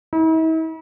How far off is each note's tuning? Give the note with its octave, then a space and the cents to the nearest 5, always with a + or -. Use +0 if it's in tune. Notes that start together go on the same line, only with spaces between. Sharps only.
E4 -45